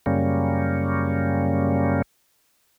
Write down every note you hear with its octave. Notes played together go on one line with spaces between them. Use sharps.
F#2 C#3 G3 A#3 C#4